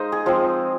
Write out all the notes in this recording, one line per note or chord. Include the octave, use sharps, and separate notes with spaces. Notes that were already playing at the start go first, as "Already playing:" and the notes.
Already playing: G#3 D#4 C5 D#5 F5
G#4
F3 G#3 C4